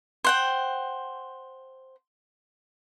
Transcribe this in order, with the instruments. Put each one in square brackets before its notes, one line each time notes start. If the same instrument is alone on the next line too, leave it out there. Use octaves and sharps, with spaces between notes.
[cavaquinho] C5 F#5 G5